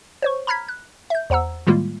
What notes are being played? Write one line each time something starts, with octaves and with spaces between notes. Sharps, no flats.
C5 C#5 C#6
A#5 B5 F6 G#6 B6
F#6
E5 G6
E2 C5 F#5 A#5 E6
A2 D#3 G3 G#3 A#3 F4